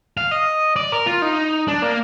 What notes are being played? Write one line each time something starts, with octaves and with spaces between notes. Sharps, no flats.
F5
D#5
D5
A#4
F4
D#4
D4
A#3